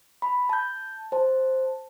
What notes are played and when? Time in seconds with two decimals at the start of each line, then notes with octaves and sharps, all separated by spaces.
0.22 B5
0.49 A5 G6
1.12 C5 A5